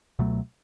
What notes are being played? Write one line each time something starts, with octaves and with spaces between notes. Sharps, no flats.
C#2 B2 F#3 A3